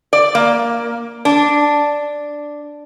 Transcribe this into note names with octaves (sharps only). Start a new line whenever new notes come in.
D5
A#3
D4